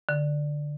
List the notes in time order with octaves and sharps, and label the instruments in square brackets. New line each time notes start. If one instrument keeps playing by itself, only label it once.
[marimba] D3